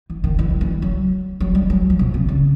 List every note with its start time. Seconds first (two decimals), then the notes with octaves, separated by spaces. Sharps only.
0.10 E3
0.24 D#3
0.39 E3
0.50 D#3
0.61 E3
0.82 F#3
1.40 F#3
1.55 G3
1.70 F#3
1.90 F3
1.99 B2
2.14 C3
2.28 C#3